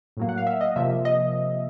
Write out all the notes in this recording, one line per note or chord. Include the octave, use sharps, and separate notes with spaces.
A2 F#3 A#3
F#5
F5
E5
D#5
C3 F3 A#3 E5
D#5